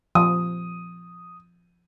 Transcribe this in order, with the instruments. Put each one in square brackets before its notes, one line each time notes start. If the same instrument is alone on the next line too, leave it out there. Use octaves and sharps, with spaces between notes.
[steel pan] F3 [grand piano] D#6